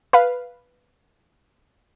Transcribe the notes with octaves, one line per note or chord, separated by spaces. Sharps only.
B4 F5